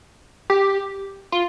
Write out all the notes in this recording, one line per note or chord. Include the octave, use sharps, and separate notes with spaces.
G4
F4